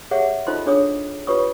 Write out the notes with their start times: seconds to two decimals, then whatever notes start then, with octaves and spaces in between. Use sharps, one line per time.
0.11 G4 G#4 C#5 E5 F#5
0.47 D#4 F4 A4 C5 D#5 C6
0.66 D4 G#4 C#5 D6 D#6
1.27 F4 G4 B4 C#5 C#6 D#6